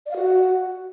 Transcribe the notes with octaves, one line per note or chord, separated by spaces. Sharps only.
D5
F5
F#4